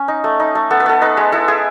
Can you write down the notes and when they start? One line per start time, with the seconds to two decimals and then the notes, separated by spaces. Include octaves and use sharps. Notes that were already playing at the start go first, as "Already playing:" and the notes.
Already playing: C#4
0.08 D#4
0.24 A3
0.40 D#4
0.55 A3
0.70 B3 A4
0.80 B4
0.86 B3 A4
1.02 D#4 B4
1.17 G#3
1.32 E4 A4
1.48 E4 G#4